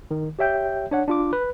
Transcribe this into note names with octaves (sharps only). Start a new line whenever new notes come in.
D#3
G4 C#5 E5 G5 G6
D4 C#5 F#5
D4 F4 D6
B4